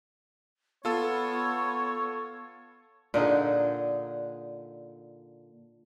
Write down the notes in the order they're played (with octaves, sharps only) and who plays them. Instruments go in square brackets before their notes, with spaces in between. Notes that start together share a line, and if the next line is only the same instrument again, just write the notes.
[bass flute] B3 [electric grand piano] F4 A4 [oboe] C#5
[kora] A#2 D3 D#4 G#4